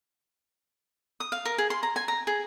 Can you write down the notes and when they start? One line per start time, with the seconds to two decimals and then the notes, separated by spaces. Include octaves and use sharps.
1.20 D#6
1.32 F5
1.45 A#4
1.58 G#4
1.70 C6
1.83 A#5
1.96 G#5
2.08 A#5
2.27 G#4